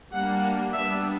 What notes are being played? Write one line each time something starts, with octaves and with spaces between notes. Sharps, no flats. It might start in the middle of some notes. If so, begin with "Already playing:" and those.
G3 A#3 D4 F#5
G3 B3 D4 E5